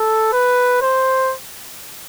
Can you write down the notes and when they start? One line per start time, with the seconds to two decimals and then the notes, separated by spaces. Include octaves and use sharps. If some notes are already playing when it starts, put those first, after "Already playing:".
Already playing: A4
0.33 B4
0.82 C5